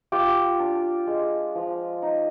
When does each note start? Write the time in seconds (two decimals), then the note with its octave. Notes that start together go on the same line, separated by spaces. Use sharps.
0.12 F4 G4
0.60 D4
1.07 G#3
1.55 F3
2.02 D#4